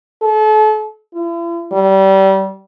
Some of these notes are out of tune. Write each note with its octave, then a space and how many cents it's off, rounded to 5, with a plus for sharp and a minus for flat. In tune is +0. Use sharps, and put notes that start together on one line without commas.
A4 -35
E4 +45
G3 -25